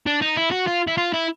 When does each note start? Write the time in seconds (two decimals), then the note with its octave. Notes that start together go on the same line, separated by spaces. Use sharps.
0.07 D4
0.22 D#4
0.37 E4
0.52 F#4
0.68 F4
0.88 E4
0.97 F4
1.13 E4